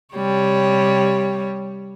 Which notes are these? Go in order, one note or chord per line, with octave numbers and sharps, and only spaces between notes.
C3 G3 C#5